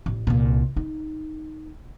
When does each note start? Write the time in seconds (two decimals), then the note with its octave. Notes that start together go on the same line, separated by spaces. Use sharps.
0.06 A1
0.27 C2 A#2
0.76 D#4